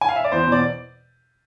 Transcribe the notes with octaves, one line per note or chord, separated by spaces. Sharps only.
G#5
F5
E5
D5
E2 C5
B2 D5